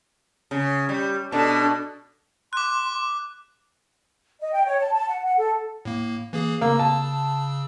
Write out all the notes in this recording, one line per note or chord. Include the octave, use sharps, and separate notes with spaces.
C#3
G3
B2 D4 A4
C6 D6 F#6
D#5
G5
C#5
A5
A5
F#5
F#5
A4
A2 A#3
E3 A#3 G#4
C#3 A#3 E6
A5